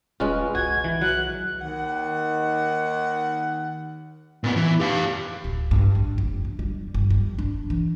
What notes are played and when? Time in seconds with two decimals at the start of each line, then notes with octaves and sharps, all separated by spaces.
0.20 D#1 G#3 C#4 F4 B4
0.55 C2 F#4 G#5 G#6
0.84 E3
1.02 F#3 F#6
1.61 D#2 D#3 F#5
4.44 A#2 B3
4.56 E3
4.80 G4 F5
5.44 D1
5.71 G2
5.95 G#1
6.18 F1
6.45 D4
6.59 G3
6.94 G1
7.10 G3
7.39 D4
7.70 E3